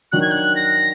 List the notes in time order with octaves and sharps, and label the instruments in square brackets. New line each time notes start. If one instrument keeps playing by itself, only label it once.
[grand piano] D#3 F#3 D4 F#4 [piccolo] F#6
[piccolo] G#6
F#6
A#6